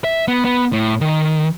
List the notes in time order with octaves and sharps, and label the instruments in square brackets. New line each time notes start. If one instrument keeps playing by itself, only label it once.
[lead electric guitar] E5
B3
B3
A2
D#3